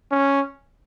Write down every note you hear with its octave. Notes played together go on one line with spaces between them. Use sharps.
C#4